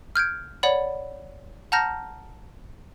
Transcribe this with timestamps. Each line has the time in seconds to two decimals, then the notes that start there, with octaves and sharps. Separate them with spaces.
0.15 F6 G6 G#6 D7
0.63 C#5 D5 F#5 B5
1.72 F#5 A5 A#5 F6 G6 A#6